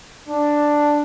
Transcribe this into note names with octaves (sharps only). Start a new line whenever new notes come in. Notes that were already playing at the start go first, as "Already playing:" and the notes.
D4